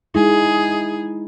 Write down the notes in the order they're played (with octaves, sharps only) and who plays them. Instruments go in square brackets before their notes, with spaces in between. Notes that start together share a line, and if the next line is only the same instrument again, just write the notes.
[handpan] G#3 D#4 E4 [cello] G#4